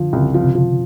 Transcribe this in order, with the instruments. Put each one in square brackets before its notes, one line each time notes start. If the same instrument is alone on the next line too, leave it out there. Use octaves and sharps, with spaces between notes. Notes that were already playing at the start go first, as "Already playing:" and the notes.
Already playing: [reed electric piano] D3 [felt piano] F3
[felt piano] C2 [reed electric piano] C#3
[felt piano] F3
[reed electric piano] C3
[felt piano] F3